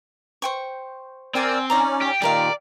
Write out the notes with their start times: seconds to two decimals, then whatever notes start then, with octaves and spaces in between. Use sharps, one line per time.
0.42 C5 G5 C#6
1.35 C4 A#4 D5 G5 G#5 C6 E6
1.70 C#4 D#4 D5 A#5
2.01 G4
2.22 A#2 D#3 G4 A#4 D5 F5